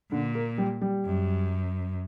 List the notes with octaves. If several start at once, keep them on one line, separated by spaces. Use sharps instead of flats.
A#2 D3
A#3
G3
G3
F#2